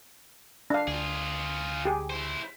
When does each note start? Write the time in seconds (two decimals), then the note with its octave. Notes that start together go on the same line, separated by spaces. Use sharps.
0.70 D4 F5
0.87 D2 F4 G#4
1.85 G4 G#4
2.10 E4 C5